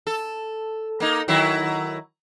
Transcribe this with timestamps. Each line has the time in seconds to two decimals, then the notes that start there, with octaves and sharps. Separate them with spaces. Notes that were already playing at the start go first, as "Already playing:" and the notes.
0.07 A4
1.00 A#3 D#4
1.28 D#3 F#3 E4